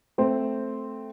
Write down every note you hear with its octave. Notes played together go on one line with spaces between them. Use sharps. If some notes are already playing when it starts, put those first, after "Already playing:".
A3 C4 C5